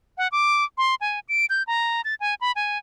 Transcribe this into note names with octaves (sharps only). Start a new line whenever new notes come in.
F#5
D6
C6
G#5
D7
G6
A#5
A6
G#5
B5
G#5